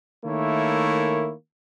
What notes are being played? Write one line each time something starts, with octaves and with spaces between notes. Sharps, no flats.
D#3 A3 A#3 E4 C#5